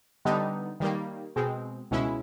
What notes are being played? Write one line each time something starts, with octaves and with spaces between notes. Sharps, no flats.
D3 G3 B3 D#4
D#3 G3 A#3
B2 G#3 C4
C#2 B2 G#3 C#4 E4